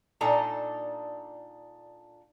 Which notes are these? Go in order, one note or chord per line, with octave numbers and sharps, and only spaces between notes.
A#2 D4 D#4 A4 A#5